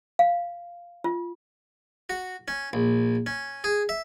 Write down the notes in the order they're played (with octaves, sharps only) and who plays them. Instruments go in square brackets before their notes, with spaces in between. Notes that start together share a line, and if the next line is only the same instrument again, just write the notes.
[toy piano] F5
F4
[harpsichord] F#4
C#4
A#1
C#4
G#4
E5